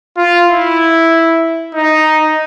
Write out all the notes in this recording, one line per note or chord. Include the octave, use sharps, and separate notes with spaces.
F4
E4
D#4